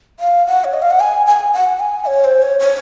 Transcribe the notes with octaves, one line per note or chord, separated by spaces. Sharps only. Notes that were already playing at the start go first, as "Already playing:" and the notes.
F5
F#5
C#5
D#5
F5
F#5
G#5
G#5
F#5
G#5
C#5
C5
C#5
C#5